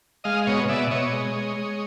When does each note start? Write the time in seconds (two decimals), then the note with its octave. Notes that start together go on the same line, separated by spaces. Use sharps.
0.24 G#3 D#5 F5
0.46 B2 C#5 D#5
0.69 B2 D5 E5
0.91 B2 C#5 D#5
1.13 G#3
1.35 G#3
1.57 G#3